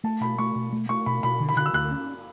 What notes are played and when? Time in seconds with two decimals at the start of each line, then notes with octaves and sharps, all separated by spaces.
0.04 A3 A5
0.21 B2 B5
0.38 A3 C#6
0.55 B2
0.73 A3
0.89 A3 C#6
1.06 B2 B5
1.23 B2 B5
1.40 D3
1.49 B5
1.56 D3 F#6
1.66 E6
1.73 D2 F#6
1.91 C#4